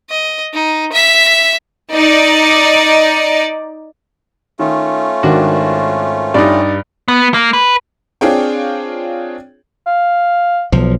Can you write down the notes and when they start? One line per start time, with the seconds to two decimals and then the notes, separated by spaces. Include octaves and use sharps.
0.10 D#5
0.54 D#4
0.93 E5 B6
1.93 D#4 D5
4.59 D#3 A3 C#4 F4
5.23 G#1 D#3 D4 F#4
6.34 G2 D#4 G4 D5
7.08 B3
7.34 A#3
7.53 B4
8.21 C4 D4 F4 G#4 C#5 G5
9.86 F5
10.72 B1 F3